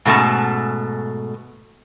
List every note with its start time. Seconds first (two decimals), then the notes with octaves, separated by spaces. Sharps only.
0.05 G#2 B2 A3 C#4 A5